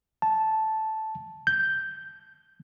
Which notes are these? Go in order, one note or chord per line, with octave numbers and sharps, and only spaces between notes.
A5
G6